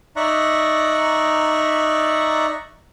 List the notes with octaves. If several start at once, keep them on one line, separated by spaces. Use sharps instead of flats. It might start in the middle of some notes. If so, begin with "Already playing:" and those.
D#4 D5 E5 A#5 C#6 F#6